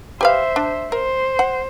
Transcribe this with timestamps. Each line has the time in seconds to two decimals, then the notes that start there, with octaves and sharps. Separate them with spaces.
0.21 G4 B4 C5 E5 F5
0.56 D4
0.92 A#4 C5
1.39 F#5